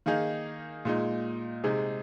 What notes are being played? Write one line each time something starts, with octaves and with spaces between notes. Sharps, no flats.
D#3 A#3 D#4 G#4
A#2 G#3 D#4
C3 G#3 D#4 G#4